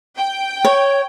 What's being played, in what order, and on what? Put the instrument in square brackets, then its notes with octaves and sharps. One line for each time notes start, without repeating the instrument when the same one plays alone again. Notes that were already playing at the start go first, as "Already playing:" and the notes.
[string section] G5
[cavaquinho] C#5